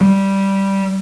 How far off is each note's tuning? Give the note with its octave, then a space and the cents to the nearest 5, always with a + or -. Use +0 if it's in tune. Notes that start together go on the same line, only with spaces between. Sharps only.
G3 -5